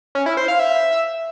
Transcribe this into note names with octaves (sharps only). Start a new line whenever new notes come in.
C#4
E4
C5
F5
E5